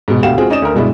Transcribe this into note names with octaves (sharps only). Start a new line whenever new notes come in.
G#2 B2
D2 B2 G4 F5 F#5 E7
G#3 C4 F4 F#4 G#4
C#4 D#4 D5 D#5 D#6 E7
D2 A#4
G2 B2 G#3 D4 E4